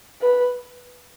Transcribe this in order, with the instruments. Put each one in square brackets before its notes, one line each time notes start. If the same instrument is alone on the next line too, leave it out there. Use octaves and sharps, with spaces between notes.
[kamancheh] B4